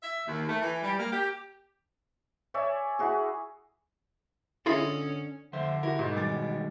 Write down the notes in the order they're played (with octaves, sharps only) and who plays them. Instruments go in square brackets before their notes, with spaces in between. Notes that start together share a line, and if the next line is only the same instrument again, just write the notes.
[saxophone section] E5
D#2
A3
E3
G3
A#3
G4
[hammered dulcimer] C#5 D5 E5 G#5
E4 F#4 G#4
[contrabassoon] D3 [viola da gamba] C#4 [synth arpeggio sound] E4 F4 G#4 [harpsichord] A4 D#5 B5
[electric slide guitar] F2 C5 E5 [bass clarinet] D3 [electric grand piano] C6
[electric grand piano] E4 F#4 G4 [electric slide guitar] A#4
[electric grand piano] G#2 [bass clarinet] B2
[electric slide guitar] D#3 G3 G#3 [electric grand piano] G#5 D6 A6